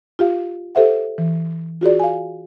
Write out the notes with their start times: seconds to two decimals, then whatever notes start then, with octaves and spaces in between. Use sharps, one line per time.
0.19 F4 G4 F5
0.75 G4 A4 C5 E5 F#5
1.18 E3
1.81 F4 F#4 G#4 D5
2.00 F5 G#5